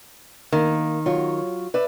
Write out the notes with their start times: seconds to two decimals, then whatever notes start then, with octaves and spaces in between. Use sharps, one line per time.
0.52 D#3 A#3
1.06 F#3 F4 C#5
1.74 B4 D5 E5